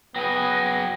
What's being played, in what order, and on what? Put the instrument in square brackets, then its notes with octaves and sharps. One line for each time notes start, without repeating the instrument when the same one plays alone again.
[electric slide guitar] F#3 G#4 [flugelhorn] B3 [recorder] G5 [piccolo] A#6